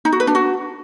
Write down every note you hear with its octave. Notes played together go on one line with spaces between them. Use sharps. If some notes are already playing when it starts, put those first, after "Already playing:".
D#4
F#4
B4
D4
F#4